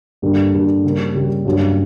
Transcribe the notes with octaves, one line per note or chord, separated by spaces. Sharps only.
G2 D3 G3 A#3
G2 D3 G3 A#3
C#3 G3 A#3
C#3 G3 A#3
G2 F#3 A#3 C#4 G4